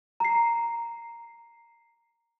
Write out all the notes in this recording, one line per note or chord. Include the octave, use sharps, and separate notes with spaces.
A#5 C7